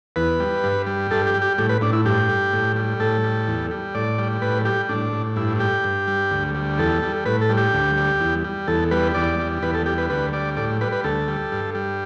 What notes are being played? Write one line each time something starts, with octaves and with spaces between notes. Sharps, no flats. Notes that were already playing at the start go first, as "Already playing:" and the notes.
E2 B4
G3
G2
G3
G2 A4
G4
G3
G4
A2 G4
B4
A2 D4
E4
G2 G4
G3
A2
G3
A2 A4
G3
E2
G3
A2 D5
G3
A2 B4
G3 G4
A2 D4
A2
G2 E4
G3 G4
G2
G3
D2
G3
E2 A4
G3
A2 B4
A4
G3
G4
D2
G3
E2
G3
E2 A4
G3 B4
E2 D5
G3
E2 B4
A4
G3 G4
B4
D2 B4
G3 D5
A2 D5
G3 B4
B4
D2 A4
G3
G2
G3